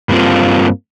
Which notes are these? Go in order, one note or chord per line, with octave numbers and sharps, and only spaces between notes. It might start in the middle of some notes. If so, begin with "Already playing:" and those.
G2 A#3 C4 F4